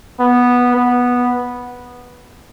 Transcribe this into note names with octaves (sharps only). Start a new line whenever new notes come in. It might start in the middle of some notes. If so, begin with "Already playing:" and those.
B3
B3